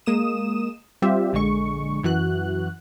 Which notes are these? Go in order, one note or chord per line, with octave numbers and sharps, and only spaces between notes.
G#3 A#3 D#6 E7
G3 C4 F4 G4 E5
A#1 D3 G#3 C#6
F#2 E3 F#4 F#6